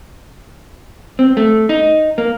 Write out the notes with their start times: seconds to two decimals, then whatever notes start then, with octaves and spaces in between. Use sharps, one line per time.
1.19 C4
1.37 A3
1.69 D#4
2.18 A#3